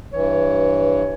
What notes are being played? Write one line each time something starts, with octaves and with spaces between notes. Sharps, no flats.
G2 E3 C#5